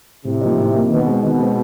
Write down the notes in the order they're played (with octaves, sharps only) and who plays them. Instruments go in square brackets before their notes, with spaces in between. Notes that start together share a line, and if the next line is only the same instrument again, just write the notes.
[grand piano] A2 [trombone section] C3
[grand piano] F3 A#3 D#4
A2
F3 A#3 D#4
[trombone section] B2 [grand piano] D#3
[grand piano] G#3 C4
[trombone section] B2 [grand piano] D#3
[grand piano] G#3 C4